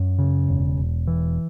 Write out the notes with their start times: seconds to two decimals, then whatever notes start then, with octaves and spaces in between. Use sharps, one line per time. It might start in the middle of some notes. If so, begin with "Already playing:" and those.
Already playing: F#2
0.19 C#3
0.48 E1
0.77 E1
1.07 E3